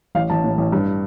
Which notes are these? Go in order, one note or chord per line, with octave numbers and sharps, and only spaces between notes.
A1 F5
A1 A5
A2
A1
G2